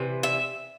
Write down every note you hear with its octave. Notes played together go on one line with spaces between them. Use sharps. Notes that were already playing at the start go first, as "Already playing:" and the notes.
Already playing: C3 E3
E5